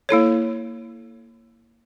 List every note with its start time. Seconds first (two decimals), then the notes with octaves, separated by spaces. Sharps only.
0.09 A#3 E4 A4 C#5